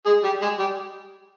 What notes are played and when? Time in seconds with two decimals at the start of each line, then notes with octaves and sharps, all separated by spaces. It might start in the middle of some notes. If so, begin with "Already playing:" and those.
0.06 G#3 G#4
0.24 G3 G4
0.42 G#3 G#4
0.59 G3 G4